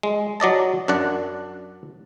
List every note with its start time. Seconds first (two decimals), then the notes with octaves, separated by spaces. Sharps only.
0.03 G#3
0.40 F#3 D5 D#5 A5
0.88 F#2 D4 D5 F#5